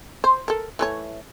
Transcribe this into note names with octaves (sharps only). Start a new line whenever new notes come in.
C5
A4 A#4
E3 A3 C#5